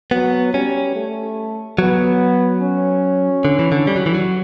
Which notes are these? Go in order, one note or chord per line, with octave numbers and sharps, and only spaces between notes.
F#3 B3
G3 C#4
A3
F#3 B3
C#4
D3
E3
D3
G3
F#3
E3
F#3